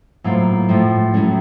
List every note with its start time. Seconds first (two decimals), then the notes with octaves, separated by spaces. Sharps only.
0.24 A2 F#3 A#3 F4 C5
0.68 A2 F3 A3
1.14 A2 F#3 A3 C#4